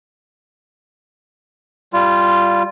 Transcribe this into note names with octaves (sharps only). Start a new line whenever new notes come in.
G3 F4